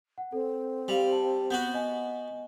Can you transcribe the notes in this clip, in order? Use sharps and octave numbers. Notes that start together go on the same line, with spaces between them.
F#5
C4 A4
G3 F5 F7
A5
B3 F#4 G6
D#5 G#5